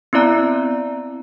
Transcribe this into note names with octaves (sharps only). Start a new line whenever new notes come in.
B3 C4 E4 D5 A#5